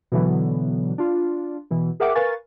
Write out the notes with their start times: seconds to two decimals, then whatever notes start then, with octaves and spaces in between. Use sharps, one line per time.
0.12 B2 D3 E3 F#3 B3
0.98 D4 F4
1.71 B2 E3
2.00 G#4 A#4 E5 F#5 G5 D6
2.15 A#4 B4 F5 G#5 C#6 A6